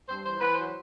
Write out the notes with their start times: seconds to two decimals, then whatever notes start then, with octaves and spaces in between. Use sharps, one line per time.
0.09 G2 C5
0.25 E3 C5
0.40 E3 B4
0.53 C5
0.58 F#3